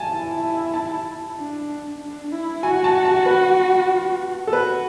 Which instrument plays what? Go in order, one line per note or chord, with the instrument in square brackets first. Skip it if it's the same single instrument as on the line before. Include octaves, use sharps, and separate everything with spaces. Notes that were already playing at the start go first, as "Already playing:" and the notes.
Already playing: [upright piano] G#5 A5
[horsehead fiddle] E4
[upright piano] A5
[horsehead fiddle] D4
D4
E4
[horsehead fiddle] F#4 [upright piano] G#5
[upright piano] A5
A5
B4
A4
[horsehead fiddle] F#4 [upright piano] B4